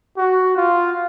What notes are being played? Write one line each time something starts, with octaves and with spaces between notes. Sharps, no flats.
F#4
F4